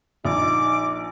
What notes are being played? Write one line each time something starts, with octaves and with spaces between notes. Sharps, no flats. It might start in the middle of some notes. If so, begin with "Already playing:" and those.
A#1 D#4 D6